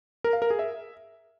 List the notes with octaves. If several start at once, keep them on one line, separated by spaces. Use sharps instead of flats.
A#4
F5
A#4
G#4
E5